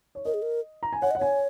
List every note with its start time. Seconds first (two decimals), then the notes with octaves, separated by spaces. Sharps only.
0.15 C#5
0.25 A#4 D#5
0.34 G#4
0.42 A#4
0.83 A#5
0.93 G#5
1.02 C#5 F#5
1.11 D#5
1.15 F#5
1.19 C#5 G#5